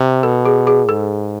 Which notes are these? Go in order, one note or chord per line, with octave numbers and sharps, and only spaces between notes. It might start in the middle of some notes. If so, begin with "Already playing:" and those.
Already playing: C3
B2 A4
G#4
G#4
G#2 A4